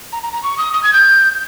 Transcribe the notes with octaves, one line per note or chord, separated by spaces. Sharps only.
A#5
A#5
A#5
C#6
D#6
D#6
G#6
G6